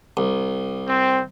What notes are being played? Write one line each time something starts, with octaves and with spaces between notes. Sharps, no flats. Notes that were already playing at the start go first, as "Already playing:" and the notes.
C2
C4